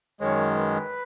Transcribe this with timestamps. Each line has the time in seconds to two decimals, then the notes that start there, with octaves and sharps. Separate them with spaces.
0.20 F#2 D#3 G#3 C#5
0.57 B4